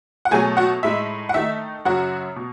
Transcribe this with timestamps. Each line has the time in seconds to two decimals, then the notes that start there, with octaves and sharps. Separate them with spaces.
0.25 F#5
0.31 B2 F#3 A3 G#4 G#5
0.57 F#4 F#5
0.83 A2 G#3 D#4 E5
1.29 F#5
1.34 D#3 A3 D#4 E5
1.85 F#2 C#3 F#3 F#4 F#5
2.36 B2